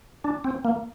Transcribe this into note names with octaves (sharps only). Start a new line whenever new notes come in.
D4
C4
A#3